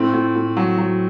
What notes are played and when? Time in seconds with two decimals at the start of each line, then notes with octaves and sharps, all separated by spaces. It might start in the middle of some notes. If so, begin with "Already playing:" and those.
Already playing: A2 C4
0.13 A2
0.35 A2
0.57 F#3
0.78 F#3